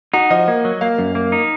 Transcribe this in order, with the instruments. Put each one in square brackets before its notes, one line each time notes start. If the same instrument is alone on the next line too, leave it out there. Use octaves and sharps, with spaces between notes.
[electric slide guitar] D#4 [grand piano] F#4
[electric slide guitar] F3 [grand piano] D#5
[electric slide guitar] A#3
F#3
[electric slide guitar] A#3 [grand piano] F5
[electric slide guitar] F#2
A#3
D#4